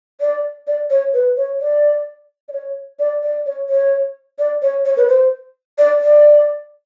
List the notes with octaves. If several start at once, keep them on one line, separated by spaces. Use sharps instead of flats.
D5
D5
C#5
B4
C#5
D5
D5
C#5
D5
D5
C#5
C#5
D5
C#5
C#5
B4
C5
D5
D5